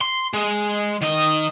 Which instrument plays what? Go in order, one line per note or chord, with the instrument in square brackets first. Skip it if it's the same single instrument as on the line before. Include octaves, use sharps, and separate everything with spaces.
[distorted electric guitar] C6
G#3
D#3 D#5